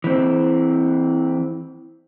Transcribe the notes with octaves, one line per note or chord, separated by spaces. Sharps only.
E3 C4